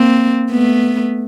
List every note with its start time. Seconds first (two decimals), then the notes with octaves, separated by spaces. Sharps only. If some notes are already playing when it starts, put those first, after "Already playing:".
Already playing: A#3 C4
0.51 A3 B3